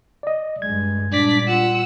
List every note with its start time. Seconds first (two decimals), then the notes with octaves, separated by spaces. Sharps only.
0.23 D5 D#5
0.62 G2 G#3 G#6
1.12 A#2 G3 D4 D5 B6
1.47 F4 F#5 E6